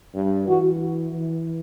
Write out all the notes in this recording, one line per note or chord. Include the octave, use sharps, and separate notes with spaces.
G2
E3 F#4
E3